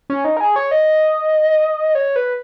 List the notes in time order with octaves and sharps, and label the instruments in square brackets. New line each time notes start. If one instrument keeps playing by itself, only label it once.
[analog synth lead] C#4
D#4
A#4
G#4
C#5
D#5
C#5
B4